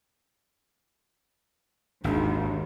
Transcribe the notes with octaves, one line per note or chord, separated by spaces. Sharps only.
G#1 D#2 D4